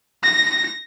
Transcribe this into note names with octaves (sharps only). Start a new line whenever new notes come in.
A#6